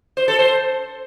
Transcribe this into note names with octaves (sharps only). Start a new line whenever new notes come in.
C5
A4
C5